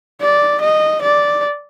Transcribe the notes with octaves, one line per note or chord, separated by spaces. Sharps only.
D5
D#5
D5